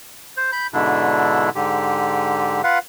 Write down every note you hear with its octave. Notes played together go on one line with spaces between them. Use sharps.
C5
B5 G6
G#2 B2 D3 D4 E4
G#2 D3 G4
F4 B4 F5 F#5